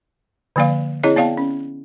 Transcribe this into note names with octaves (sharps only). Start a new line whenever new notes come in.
D3 F3 A#3 D5 F5
C4 E4 G#4 C#5 D#5
B3 D5 F5 G5 A5
C#4